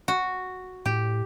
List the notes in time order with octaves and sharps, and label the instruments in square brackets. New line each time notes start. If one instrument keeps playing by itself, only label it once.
[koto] F#4
[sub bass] A2 [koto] G4